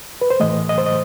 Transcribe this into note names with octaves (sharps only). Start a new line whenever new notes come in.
B4
C5
A2 E3 A3 D#5
D#5
C5
D#5